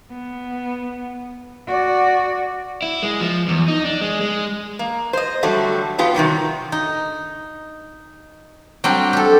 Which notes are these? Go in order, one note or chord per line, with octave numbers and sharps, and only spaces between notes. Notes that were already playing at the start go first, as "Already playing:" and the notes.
B3
F#4 D5
E4
G#3
F3
E2
D#4
D4
G#3
G#3
A#3
C5 D#5
D3 F#3 G3 A3
B3 F4 G4
C3 D#3 F#3 G3
D#4
F#3 G3 C4 D4 G4
G4 A4